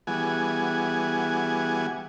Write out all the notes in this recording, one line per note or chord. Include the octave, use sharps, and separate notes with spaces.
E3 G3 B3 F#4 G#4 G#5